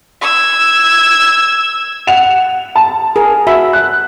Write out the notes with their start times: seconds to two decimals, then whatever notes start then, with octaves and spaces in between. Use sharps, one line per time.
0.21 E6 G#6
2.07 F#5 E7 F7
2.75 A5
3.16 G#4 A#4
3.47 F#4 E5 B5
3.73 F#6